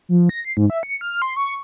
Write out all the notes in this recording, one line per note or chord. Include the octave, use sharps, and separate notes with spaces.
F3
A#6
C7
G#2
E5
C#7
F6
C6
C#6